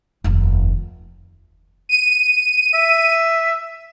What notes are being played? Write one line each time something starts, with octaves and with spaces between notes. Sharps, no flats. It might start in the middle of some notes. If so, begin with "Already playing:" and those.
F1 D#2
D#7
E5